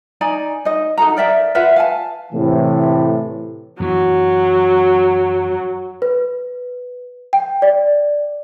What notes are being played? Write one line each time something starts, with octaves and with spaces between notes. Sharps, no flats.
D#4 D5 G#5 A#5
D#4 D#5
D#4 F#4 A4 A#5
A#4 D5 E5 G5
F4 B4 E5 F#5
F5 G#5 A5
A2 C3 E3
F#2 E3 F#3
B4
G5
D5